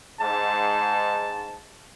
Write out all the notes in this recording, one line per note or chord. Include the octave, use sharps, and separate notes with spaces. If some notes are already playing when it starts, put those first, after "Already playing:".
G#2 A5